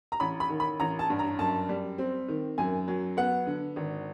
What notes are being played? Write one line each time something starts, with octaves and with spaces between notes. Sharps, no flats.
A#5
A1 B5
B5
D#3
B5
A1 A#5
A5
G2
A#5
F#2 A5
G3
C4
D#3
F#2 G#5
F#3
B3 F#5
D3
G#1